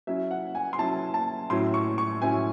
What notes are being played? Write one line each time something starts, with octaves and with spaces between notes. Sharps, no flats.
F#3 C#4 E4 E5
F#5
G#5
C6
F#3 C#4 E4 A5
A5
A2 F#3 C#4 E4 C6
C#6
C#6
A2 F#3 C#4 E4 G#5